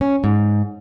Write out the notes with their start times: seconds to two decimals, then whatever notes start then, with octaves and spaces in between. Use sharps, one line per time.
0.01 C#4
0.24 G#2